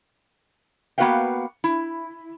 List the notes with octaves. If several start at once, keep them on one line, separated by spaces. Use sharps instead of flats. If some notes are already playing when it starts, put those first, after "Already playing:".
A#3 B3 F#4 B4 F5 G5
E4